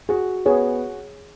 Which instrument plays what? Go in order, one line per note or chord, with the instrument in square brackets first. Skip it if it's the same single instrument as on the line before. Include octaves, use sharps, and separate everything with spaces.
[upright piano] F#4 [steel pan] G#4
[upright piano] B3 [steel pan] G#4 C#5